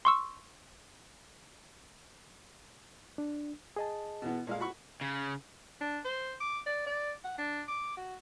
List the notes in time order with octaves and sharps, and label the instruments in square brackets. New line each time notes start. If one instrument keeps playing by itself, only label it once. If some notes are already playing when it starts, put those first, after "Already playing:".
[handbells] C6 C#6 E6
[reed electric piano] D4
G#4 D#5 A5
[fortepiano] B2 E3 B3
A#2 G#3 F5
F#4 B5 C#6
[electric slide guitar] C#3
[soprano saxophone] D4
C5
D6
D5
D5
F#5
D4
D6
F#4